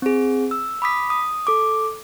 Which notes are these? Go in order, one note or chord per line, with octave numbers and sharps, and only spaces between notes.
C4 G#4
E6
B5 D6 D#6 B6
D#6
A4 D6